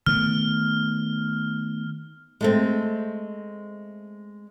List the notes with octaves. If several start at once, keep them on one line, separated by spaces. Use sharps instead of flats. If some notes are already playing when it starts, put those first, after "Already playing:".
D#3 A3 B3 F6
G#3 A3 C4